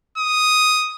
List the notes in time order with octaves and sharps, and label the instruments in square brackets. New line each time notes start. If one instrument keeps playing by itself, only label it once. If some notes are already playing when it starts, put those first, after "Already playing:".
[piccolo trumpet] D#6